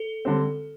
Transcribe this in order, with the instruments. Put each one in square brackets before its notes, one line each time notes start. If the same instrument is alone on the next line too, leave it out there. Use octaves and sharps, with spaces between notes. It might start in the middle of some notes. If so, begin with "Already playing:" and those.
Already playing: [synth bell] A4
[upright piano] D3 G3 C4